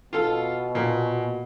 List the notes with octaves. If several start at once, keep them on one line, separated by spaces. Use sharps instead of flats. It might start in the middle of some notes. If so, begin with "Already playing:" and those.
B2 F4 A4
A#2